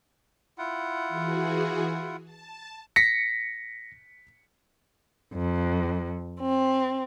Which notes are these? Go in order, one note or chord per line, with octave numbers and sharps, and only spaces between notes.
E4 F4 F#5
E3 F#4 G#4
A5
A#6 B6 C#7
F2
C4